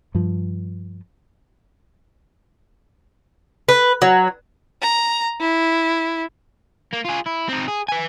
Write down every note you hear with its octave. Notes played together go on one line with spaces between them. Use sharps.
G2 F3
B4
F#3
A#5
E4
A#3
F4 G#4
E4
C4 D#4
G#4
B4 G#5